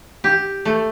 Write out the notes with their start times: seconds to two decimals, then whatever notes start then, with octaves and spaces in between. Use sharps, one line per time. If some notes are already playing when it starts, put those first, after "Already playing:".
0.24 G4
0.65 A3